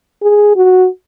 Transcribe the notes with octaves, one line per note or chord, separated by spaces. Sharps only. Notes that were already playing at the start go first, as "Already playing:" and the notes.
G#4
F#4